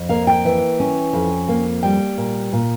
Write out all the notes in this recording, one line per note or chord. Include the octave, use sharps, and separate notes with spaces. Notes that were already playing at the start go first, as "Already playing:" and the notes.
Already playing: F2
A#3 F5
G5
E3
C#4
F2
A#3
G3 G5
A#2
A#2